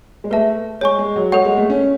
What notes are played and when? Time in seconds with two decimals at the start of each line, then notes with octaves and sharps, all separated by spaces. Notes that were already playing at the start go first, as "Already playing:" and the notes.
0.24 G#3
0.31 A3 B4 E5 A5
0.81 G#3 C#5 G#5 C#6
0.98 G#3
1.16 F#3
1.32 G#3 A4 C#5 F#5 C#6
1.45 G#3
1.57 A3
1.70 C#4